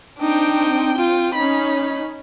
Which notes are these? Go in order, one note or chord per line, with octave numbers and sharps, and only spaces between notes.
C4 D4 D#4 G5
F4
C#4 D#4 B5